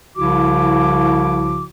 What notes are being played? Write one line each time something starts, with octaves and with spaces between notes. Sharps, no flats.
C2 C#3 F3 E4 F#4 D6